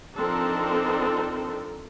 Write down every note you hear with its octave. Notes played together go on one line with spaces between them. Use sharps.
F3 C4 D4 D#4 A4 A#4